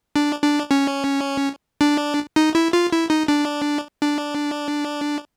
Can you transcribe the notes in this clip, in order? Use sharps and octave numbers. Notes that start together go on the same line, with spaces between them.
D4
D4
C#4
D4
D#4
E4
F4
E4
D#4
D4
D4